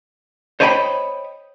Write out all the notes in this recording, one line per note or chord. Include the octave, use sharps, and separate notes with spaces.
C5 C#5 D#5 G5 G#5 B5